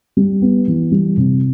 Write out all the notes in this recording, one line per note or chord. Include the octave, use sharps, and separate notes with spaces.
G3
B3
E3
G3
C3